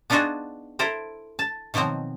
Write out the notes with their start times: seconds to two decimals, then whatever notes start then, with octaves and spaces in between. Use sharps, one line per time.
0.10 B3 D4 D#4 F4 F#4 G#4
0.79 E4 A4 A#4 C5
1.39 A5
1.74 B2 D#3 F3 F#3 C4